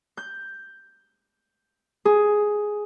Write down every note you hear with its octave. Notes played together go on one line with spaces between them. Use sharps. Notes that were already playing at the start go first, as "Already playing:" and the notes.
G6
G#4